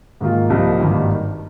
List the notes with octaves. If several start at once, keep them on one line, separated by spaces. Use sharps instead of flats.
G#2 D#3 A#3 F4
C2 C3 F3 A#3 D#4
G#1 G2 D#3 A#3